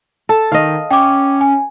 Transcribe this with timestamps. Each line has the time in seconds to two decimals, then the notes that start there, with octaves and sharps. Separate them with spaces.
0.29 A4 A5
0.52 D#3 D#5 F5
0.91 C#4 G5 D6
1.41 G#5